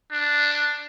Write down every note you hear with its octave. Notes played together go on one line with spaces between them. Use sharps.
D4